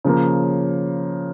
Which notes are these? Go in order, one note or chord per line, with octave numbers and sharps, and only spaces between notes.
C#3 F3 A#3